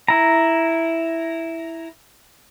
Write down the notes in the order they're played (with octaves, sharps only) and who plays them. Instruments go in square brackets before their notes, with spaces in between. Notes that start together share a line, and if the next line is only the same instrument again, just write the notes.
[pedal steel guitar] E4 A#5